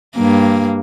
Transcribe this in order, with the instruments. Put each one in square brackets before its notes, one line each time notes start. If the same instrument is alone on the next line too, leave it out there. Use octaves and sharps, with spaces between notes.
[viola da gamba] G2 A#3